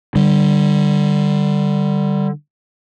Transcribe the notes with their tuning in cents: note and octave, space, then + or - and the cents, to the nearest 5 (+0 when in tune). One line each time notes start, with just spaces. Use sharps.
D3 +25 G3 +0